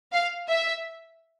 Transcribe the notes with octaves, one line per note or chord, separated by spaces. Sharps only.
F5
E5